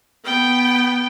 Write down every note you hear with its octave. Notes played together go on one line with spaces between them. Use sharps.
B3 G5